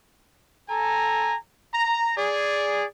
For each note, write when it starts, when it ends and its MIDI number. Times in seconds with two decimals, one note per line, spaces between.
0.70 1.35 69
0.70 1.35 80
0.70 1.35 82
1.74 2.14 82
2.17 2.84 68
2.17 2.84 74